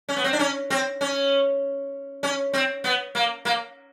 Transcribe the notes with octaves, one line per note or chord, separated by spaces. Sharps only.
C#4
B3
C4
D4
C#4
C4
C#4
C#4
C4
B3
A#3
A#3